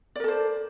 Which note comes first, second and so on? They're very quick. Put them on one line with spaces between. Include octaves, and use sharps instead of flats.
D5 A#4 A4 C5